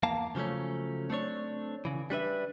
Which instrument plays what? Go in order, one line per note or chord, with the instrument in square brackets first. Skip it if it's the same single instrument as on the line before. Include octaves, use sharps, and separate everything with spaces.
[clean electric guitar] E2 A#3 F5 A5
C#3 F3 F#3 A3 C#4
A3 C4 D4 C#5
C#3 E3
G3 D4 B4 E5